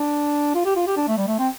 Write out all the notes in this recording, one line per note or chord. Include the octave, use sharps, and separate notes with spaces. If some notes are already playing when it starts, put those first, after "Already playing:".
Already playing: D4
F4
G4
F4
G4
D4
A3
G3
A3
C4